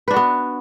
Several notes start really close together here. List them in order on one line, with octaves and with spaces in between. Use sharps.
B4 D4 F#4 B3